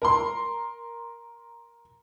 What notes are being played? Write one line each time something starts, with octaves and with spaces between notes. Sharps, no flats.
A#4 A#5 C6